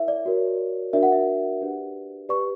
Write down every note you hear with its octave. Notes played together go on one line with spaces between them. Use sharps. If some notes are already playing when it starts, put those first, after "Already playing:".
Already playing: E4 A#4 C#5 E5
D5
F#4 A#4 C#5
D4 F#4 A#4 D5 E5
F#5
E5
D4 G4 B4 D5
G4 B4 D5 C#6